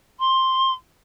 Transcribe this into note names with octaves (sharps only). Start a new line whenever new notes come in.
C6